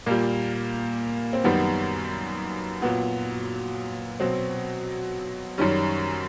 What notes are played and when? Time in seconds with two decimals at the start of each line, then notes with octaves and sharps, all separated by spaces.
0.06 A#2 G3 A#3
1.33 C4
1.44 F#2 D#3 G3 B3
2.82 A#2 F#3 B3
4.20 B2 F#3 C4
5.58 F#2 D#3 G3 C#4